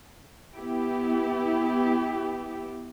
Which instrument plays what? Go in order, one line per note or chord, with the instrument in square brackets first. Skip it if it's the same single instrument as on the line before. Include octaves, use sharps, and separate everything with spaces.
[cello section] B3 E4 G4